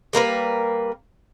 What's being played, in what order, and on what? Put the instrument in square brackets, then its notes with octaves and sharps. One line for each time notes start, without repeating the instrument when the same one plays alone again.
[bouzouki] G3 A#3 A#4 B4